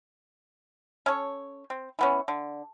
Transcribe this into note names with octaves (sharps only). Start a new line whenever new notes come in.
C#4 A4 C#5
C4
E3 B3 C#4
D3